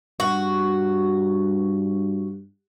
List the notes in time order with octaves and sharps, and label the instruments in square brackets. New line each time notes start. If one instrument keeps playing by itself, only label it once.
[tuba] G2 [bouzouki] F#4